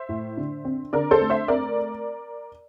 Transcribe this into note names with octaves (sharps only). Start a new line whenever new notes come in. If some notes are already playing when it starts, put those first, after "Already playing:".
Already playing: C5 E5
A2
D3
C4
D3 A#4 D5
A4 C5
A3
C5 E5
C4 A#4 D5